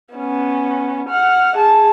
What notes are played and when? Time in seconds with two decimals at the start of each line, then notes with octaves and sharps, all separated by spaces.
0.15 B3 C#4
1.10 F#5 F6
1.57 G#4 A5